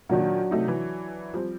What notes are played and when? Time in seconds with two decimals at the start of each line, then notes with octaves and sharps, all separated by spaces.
0.09 A#2 D#3 F#3 D4 F#4
0.51 C3 A3 D#4
0.68 E3
1.34 F3 G3 C4